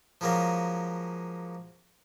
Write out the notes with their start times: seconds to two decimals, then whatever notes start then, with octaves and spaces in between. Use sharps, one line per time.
0.21 F3 F#3 G#3 A#3 C#4